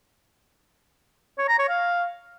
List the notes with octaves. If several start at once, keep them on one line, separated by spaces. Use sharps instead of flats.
C#5
A#5
C#5
F5